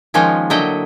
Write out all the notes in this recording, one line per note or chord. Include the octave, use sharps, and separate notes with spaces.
D#3 F3 G#3 A#3 C#4 D#4
D3 F#3 E4 D#5 G5